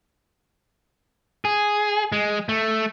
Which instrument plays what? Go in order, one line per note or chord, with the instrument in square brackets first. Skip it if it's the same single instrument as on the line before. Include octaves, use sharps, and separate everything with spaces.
[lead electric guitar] G#4
G#3
A3